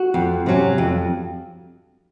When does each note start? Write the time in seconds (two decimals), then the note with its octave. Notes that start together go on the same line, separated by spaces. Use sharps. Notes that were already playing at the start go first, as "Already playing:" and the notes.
Already playing: F#4
0.14 F2
0.46 C3 F#3 C#4
0.78 F2